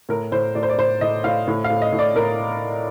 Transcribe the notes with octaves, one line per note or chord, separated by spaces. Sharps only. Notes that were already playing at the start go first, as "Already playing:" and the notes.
A2 A#4
A2 C5
A2 D5
C5
D5
A2 C5
A2 D#5
A2 F5
A2
F5
A2
D#5
A2
D5
A2 A#4